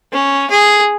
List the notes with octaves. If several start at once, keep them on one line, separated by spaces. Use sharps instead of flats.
C#4
G#4